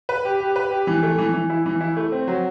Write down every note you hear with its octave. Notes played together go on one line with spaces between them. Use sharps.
B4
G4
G4
B4
G4
E3
A3
E3
E3
E4
E3
E4
A3
C4
F#3